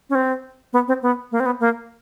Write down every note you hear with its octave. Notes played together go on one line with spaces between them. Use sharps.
C#4
C4
B3
C4
B3
A#3
C4
B3
A#3